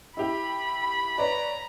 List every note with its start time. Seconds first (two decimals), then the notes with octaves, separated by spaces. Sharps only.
0.17 E4 G4 B5
1.18 B4 C#5 D5 A#5